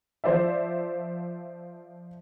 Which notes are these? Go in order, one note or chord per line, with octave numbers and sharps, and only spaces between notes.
F3 C5 D5 E5